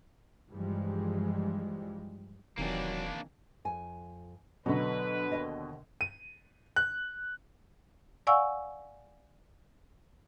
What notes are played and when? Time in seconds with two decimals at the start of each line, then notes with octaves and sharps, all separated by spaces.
0.50 G2 E3 F3 G3 G#3
2.58 E1 C3 D#3 E3 F#3 A#3 D4
3.65 F2 G#5
4.66 B2 D3 F#3 A4 B4 D#5
5.32 D#2 C#5 D#5
6.01 D#7
6.76 F#6
8.27 D5 F5 F#5 G#5 C#6 E6